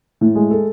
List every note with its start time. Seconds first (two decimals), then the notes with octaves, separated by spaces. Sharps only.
0.21 A2
0.35 G#3
0.51 A4